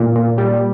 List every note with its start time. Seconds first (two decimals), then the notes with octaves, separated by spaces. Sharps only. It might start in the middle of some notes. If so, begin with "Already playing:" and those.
Already playing: A#2
0.16 A#2
0.38 G3